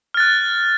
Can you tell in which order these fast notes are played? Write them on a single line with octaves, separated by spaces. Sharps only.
F6 A6 F#6